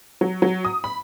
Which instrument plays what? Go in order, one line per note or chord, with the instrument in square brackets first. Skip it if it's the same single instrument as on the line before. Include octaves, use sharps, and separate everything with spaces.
[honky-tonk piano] F#3
F#3
D#6
B5